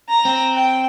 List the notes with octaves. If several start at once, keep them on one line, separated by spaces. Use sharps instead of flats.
A#5
C4
G5